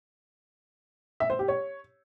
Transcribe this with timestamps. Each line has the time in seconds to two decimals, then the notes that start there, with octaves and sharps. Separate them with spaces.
1.20 E5
1.30 C5
1.39 G4
1.48 C#5